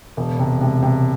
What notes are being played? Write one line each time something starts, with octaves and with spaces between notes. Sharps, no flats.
E1
C3
C3
C3